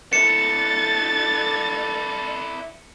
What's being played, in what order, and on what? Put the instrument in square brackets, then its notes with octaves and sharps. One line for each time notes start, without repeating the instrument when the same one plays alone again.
[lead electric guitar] D4 E4 [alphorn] A4 [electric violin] A6 [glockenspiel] C#7